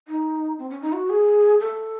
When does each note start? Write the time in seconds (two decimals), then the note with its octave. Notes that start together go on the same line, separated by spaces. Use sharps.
0.08 D#4
0.59 C4
0.70 C#4
0.82 D#4
0.93 F#4
1.10 G#4
1.60 A4